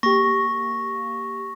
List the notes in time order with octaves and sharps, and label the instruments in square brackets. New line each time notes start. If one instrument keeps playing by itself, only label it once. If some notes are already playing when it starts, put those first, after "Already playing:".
[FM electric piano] A#3 G4 [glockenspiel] C#6 A#6